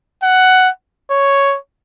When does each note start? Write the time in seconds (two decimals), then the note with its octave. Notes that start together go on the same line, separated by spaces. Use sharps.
0.23 F#5
1.11 C#5